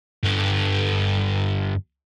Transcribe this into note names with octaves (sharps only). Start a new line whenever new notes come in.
G2 D3